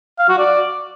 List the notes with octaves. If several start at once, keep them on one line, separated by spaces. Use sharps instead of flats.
F5
F#4
D5